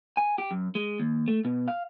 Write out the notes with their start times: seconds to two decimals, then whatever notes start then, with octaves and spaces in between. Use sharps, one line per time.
0.17 G#5
0.38 G4
0.51 F#2
0.75 G#3
1.00 D#2
1.28 A3
1.45 B2
1.68 F5